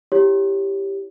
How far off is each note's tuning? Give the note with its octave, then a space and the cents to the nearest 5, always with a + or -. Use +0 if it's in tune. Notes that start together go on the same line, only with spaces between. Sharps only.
E4 +0 G4 +0 C#5 +0